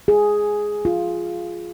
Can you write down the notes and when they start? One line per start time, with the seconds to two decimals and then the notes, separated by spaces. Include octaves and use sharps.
0.08 G#4
0.85 F4